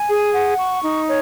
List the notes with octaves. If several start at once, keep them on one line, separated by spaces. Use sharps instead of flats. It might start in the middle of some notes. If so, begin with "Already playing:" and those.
Already playing: G#5
G#4
F#5
C#6
D#4
C#5